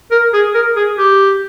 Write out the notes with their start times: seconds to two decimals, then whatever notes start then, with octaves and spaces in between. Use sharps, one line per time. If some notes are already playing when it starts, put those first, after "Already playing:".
0.11 A#4
0.33 G#4
0.54 A#4
0.76 G#4
0.98 G4